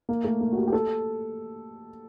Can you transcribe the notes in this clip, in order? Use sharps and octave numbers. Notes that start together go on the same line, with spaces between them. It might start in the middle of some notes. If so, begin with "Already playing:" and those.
A#3
A3
A#3
F#4
G4
G4
A4